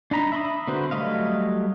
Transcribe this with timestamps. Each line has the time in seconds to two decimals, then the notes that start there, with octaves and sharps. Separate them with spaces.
0.11 D4 D#4 A#5 B5
0.32 E5 B5 C6 D#6
0.67 D3 C4 F#4 B4 C5
0.91 F#3 G3 A3 D#5 F5